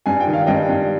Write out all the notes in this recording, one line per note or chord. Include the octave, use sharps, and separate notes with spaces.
G2 G#5
G5
D#3
F5
G2 D#5 G5
G2